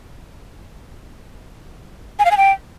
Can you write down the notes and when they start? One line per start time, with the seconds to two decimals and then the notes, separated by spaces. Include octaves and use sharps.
2.19 G#5
2.25 F5
2.31 G#5
2.37 G5